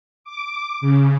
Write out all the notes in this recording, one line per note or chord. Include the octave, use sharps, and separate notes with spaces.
D6
C#3